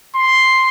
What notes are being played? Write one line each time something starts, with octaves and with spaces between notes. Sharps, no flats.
C6